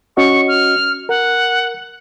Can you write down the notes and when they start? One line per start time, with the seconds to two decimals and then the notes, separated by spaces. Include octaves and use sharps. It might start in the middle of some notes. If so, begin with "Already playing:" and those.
0.17 C#4 F#4 D#5 C#6
0.48 F6
1.09 A#4 F#5